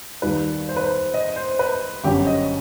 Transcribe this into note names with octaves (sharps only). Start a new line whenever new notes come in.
D#2 D#3 G3 B4
C5
B4
C5
D#5
C5
B4
G1 F#2 F#3 G4
D#5